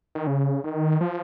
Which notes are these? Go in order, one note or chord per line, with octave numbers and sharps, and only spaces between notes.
D#3
C#3
D#3
F3